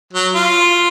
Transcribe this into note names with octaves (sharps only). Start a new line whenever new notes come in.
F#3
F4